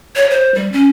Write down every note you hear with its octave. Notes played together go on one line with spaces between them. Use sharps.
C#5
C5
G3
C#4